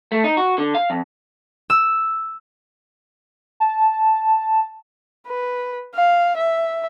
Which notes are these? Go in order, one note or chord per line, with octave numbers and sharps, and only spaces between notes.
A3
D#4
F#4
D3
F5
F2
E6
A5
B4
F5
E5